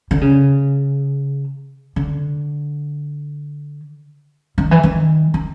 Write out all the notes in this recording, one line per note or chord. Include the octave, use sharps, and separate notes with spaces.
D3
C#3
D3
D#3
E3
D#3
D#3